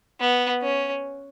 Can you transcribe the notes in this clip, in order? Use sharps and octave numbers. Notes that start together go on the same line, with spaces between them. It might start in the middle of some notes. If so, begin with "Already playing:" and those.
B3
C#4